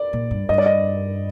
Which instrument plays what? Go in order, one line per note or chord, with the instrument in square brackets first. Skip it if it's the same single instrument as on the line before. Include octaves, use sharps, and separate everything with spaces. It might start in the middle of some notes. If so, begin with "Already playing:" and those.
Already playing: [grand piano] D5
[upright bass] A#2
G2
[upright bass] G2 [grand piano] D#5
[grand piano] D5
D#5